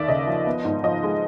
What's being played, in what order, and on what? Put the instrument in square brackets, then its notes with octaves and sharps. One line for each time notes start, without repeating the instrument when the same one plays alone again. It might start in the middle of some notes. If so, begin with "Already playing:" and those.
Already playing: [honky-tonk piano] D#2 A#3 D5 E5
C#3 D#5
F3
B3
G#2
F3 D#5
G#3